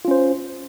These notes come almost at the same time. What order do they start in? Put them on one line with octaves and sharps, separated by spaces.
F4 C#4 C5